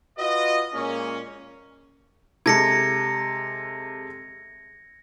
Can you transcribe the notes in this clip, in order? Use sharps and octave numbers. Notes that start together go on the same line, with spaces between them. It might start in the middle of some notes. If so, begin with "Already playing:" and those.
F4 F#4 B4 D#5
A#2 G#3 A#3 C#4
C3 G#3 A4 G#6 A#6 C#7